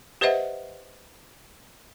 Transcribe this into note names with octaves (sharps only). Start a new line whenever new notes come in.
G4 B4 C5 D#5 E5 F#5